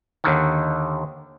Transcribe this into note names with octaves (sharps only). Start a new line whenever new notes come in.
D#2 D3 D#3